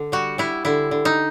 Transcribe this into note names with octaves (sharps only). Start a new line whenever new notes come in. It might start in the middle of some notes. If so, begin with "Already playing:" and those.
Already playing: D3
G3 F#4
G3 E4
D3 E4
D3
D#4